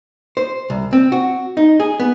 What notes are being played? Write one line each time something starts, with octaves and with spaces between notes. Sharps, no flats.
C5
C2
C4
F#4
D#4
G#4
B3